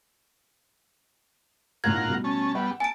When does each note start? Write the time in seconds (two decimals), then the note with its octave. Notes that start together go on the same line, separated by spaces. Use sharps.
1.84 B1 A2 F4 A#4 F#5 G#6
2.07 B2 G3 A3
2.24 C#4 A5
2.55 G3 B3 E5 F#5
2.80 G#5 A5 D7